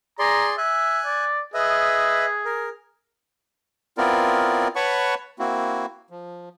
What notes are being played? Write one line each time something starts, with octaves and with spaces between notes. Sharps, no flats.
G#4 D5 A#5 C6
E5 G#5 F#6
D5
G#4 B4 D#5 E5
A#4
B3 C4 E4 F4 A#4 D5
B4 C#5 F#5 A5 B5 C#6
A#3 C4 E4 F#4
F3